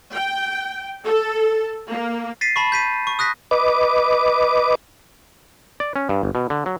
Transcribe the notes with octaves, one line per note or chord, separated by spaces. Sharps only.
G5
A4
A#3
A6 B6 C7 D#7
A5 B5 C#6
G6 B6 D#7
C#6
D#6 F#6 A#6 B6
B4 D#5 D6
D5
C#4
G2
G1
B2
D3
F#3